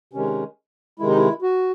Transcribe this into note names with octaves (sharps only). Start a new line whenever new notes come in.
C3 D#3 G#3 C#4
C3 D#3 G#3 E4
D#4
E4
F#4